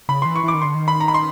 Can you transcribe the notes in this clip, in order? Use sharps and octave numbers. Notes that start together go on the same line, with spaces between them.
C#3 B5
E3 C6
C#6
E3 D6
D#3
D3 C6
D#3
B5
A#5
B5
C6